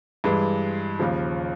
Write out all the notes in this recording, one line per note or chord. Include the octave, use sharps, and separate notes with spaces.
G2 E3 G#3
D#2 C#3 F3